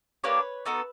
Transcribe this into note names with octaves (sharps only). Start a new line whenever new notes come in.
A#3 D4 G4 B4 C#5
B3 D#4 F#4 A4